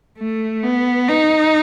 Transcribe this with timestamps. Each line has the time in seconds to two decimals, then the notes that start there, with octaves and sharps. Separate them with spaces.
0.18 A3
0.63 B3
1.08 D#4